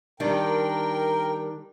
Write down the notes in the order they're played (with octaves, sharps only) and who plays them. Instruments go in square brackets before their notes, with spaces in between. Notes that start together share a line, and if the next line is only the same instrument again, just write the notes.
[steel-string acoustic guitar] D#3 G3 D4 [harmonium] A#4 G5